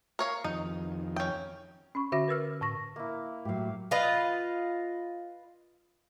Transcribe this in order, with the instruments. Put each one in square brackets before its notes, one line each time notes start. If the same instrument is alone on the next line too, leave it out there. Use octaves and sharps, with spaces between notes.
[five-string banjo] A#4 C#5 F5
[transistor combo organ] F2 D#3 [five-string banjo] D#4
[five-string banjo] C#4 G5
[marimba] C#4 B5 C#6
D3 F#4 E5 B5 D6 A#6
A#4 B4 E6 F6
A2 C#6 A#6
[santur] A#3 E4
[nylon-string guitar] A2 F#3 [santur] G4 F5
[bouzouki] F4 B4 D#5 F5